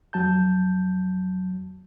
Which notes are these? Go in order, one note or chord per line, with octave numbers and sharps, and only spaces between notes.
F2 F#3 A5 G6